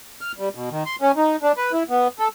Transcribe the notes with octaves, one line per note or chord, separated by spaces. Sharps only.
F6
G3
B2
D#3
C6
C#4
D#4
D4
B4
E4
B3
A4